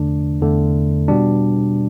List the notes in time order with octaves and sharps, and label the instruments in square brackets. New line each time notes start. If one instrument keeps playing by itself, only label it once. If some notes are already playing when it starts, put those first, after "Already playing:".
Already playing: [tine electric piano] E2 D3 A3 D4
E2 D3 A3
B2 G3 D4